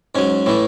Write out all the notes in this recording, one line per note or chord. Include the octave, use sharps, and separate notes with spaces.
G#2 F#3 C#4
A2 E3 A3